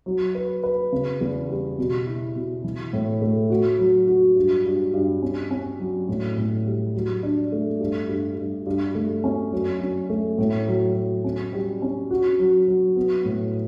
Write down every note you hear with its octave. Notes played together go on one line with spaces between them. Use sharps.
F#3
B4
B4
C#3
E2
G3
B2
E4
B2
E3
A2
A3
F#4
F#3
F#4
G2
G2
G2
C#4
C#4
F#3
A2
A2
G3
F#3
D4
A3
G2
G2
G2
G2
A3
C#4
F#2
F#2
A3
A2
F#3
F#3
C#4
G3
C#4
F#4
F#3
F#3
B3
A2